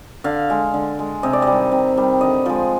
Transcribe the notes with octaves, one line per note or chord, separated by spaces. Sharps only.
D3 F5
G#3
D3
G#3
C3 D#5
D5
G3 D#5
D#3
C3
D#3 G3
D3 D#5
F3 G#3